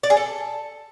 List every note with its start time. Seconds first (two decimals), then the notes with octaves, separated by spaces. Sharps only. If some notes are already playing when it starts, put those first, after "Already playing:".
0.03 D5
0.10 G#4
0.17 A4